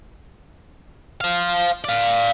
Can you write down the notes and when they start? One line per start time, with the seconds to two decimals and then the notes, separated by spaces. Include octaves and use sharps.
1.21 C5 F5
1.84 D5 F5